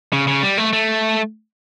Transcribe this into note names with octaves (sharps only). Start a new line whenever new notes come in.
C#3
C#3
G3
A3
A3